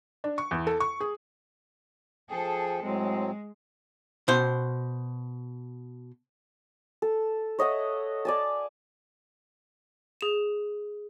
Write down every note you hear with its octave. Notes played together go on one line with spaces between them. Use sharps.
D4
C#6
E2
A4
C#6
G#4
F3 G#4 A4 G5
A2 F#3 G#3 C4
B2 C5
A4
C#5 D#5 E5 F#5
D5 G#5 A5
G#4 E7